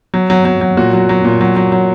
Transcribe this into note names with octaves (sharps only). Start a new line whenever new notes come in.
F#3
F#3
F#3
F#3
A#2 F#4
F#3
F#3
A#2
F#3
F#3
F#3